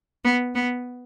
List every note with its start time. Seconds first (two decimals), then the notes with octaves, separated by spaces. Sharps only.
0.25 B3
0.55 B3